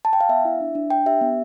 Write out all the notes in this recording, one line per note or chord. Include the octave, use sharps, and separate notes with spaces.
A5
G5
F5
B3 E5
E4
D4
D4
D4 G5
G4 E5
B3